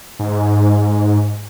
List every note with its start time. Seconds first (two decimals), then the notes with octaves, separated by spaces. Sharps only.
0.20 G#2